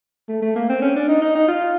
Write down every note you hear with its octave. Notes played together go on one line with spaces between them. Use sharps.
A3
A3
A#3
C4
C#4
D4
D#4
D#4
D#4
F4